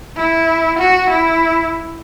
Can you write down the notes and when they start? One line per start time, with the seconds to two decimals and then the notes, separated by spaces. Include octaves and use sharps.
0.16 E4
0.78 F#4
1.09 E4